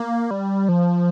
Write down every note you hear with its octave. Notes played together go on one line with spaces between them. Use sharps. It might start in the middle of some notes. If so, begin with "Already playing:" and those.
Already playing: A#3
G3
F3